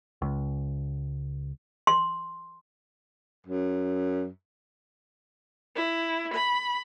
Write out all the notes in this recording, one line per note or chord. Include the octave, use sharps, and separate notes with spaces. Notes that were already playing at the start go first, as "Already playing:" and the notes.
C#2
C6
F#2
E4
B5